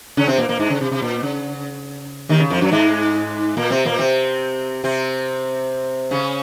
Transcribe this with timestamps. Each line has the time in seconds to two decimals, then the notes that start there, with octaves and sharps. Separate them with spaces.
0.17 C#3 C#4
0.28 C3 C4
0.38 A#2 A#3
0.49 A#2 A#3
0.59 G#2 G#3
0.70 C#3
0.81 C3
0.92 C3
1.02 A#2
1.23 C#3
2.29 D#2 D#3
2.40 C#3
2.50 F2 F3
2.61 F#2 F#3
2.72 G#2 G#3
3.57 A#2 A#3
3.70 C3 C4
3.85 A#2 A#3
3.99 C3 C4
4.84 C3 C4
6.11 C#3 C#4